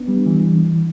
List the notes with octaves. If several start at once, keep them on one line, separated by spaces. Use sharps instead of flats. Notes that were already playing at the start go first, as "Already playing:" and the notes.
Already playing: B3 D4
G3
E3